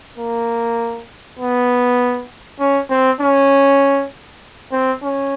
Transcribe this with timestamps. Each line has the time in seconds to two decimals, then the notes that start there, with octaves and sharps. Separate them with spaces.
0.18 A#3
1.40 B3
2.60 C#4
2.90 C4
3.21 C#4
4.72 C4
5.03 C#4